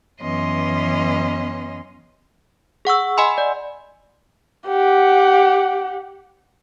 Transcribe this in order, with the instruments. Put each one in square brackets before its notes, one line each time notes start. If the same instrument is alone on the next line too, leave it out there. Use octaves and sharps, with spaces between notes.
[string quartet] F#2 E3 B3 C#4 D#5 C6
[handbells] G#4 F#5 C#6 E6
D#5 F#5 G#5 B5 C6 E6
D5
[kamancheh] G4 F#5